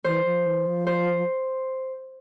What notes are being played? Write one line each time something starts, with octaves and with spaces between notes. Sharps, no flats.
E3 C5
F3
E3
F3
C5